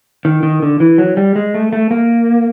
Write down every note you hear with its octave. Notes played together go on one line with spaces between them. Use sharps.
D#3
D#3
D3
E3
F#3
G3
G#3
A3
A3
A#3